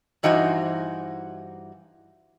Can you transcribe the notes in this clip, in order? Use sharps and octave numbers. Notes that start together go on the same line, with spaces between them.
G2 E3 D#4 F#4 C5 G#5